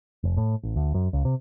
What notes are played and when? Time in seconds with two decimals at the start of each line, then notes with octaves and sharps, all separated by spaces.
0.24 F1
0.37 A2
0.63 A1
0.76 D2
0.94 F#2
1.13 C#2
1.25 C3